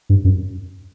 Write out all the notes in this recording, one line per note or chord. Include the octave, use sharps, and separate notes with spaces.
G2
F#2